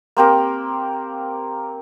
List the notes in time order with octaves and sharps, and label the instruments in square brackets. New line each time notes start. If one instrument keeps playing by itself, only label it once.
[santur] A#3 C4 G4 A#4